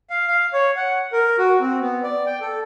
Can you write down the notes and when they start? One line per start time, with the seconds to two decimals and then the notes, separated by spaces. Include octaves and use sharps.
0.10 F5
0.28 F5
0.53 C#5
0.76 F#5
1.12 A#4
1.38 F#4
1.60 C4
1.81 B3
2.03 D5
2.26 G5
2.41 A4